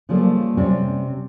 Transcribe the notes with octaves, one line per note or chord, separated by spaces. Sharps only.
C#3 F3 G3 A3 A#3
C3 G3 C#4